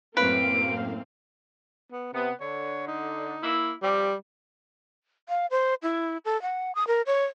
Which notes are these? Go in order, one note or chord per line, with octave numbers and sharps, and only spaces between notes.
F#2 A2 A#3 C4 B4 F5 D7
B3
C3 B3
D3 C#5
D#4
A#3 E4
F3 G3 C4 G4
F5
C5
E4
A4
F#5
D#6
A#4
C#5